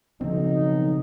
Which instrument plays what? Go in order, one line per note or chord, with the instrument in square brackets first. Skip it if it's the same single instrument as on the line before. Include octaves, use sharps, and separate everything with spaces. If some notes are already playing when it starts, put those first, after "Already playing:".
[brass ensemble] B1 D#4 [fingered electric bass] C#3 F3 C4